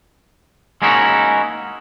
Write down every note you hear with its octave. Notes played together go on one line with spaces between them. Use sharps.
G#3 A#3 C#4 D#4 E4 F#4